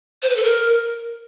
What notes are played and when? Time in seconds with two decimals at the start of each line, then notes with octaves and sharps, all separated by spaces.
0.22 C5
0.29 B4
0.36 A4
0.43 A#4